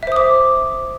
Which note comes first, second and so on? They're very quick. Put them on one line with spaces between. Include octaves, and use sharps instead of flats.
E5 C5 D#6 D6